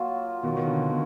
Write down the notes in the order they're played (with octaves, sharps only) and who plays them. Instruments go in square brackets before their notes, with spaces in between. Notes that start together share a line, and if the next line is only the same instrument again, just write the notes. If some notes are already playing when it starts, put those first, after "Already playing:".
Already playing: [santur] F#3 A#3 F4
[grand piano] B2 D#3
D#3
D3
B2